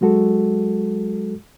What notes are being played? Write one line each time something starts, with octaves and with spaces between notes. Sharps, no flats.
F#3 G#3 F#4 A4